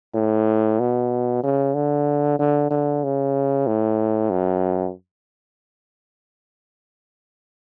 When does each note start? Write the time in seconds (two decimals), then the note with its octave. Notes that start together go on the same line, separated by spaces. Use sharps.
0.14 A2
0.79 B2
1.43 C#3
1.74 D3
2.39 D3
2.70 D3
3.03 C#3
3.67 A2
4.30 F#2